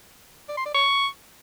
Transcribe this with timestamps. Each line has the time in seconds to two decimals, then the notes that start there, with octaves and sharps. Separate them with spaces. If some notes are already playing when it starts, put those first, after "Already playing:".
0.49 D5
0.57 C6
0.66 D5
0.74 C#6